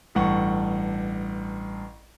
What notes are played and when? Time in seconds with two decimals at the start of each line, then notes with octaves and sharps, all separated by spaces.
0.15 A1 G2 F#5 C#6